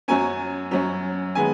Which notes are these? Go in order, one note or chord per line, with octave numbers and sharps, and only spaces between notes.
F#2 F#3 C#4 G#5
F#2 F#3 C#4
D#3 G#3 B3 G#5